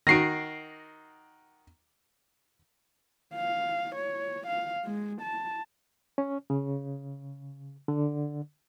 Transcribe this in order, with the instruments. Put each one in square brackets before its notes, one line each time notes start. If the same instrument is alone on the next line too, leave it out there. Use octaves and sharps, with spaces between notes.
[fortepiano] D#3 F#4 [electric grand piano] A#6 C7 D7
[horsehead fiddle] F5
C#5
F5
G#3
A5
[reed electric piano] C#4
C#3
D3